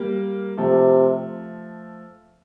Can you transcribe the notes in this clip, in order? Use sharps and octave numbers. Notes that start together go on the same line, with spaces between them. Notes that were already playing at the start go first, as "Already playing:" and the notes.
Already playing: G3 A#3
C3 F3 A3